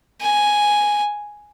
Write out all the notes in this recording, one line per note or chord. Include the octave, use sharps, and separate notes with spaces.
G#5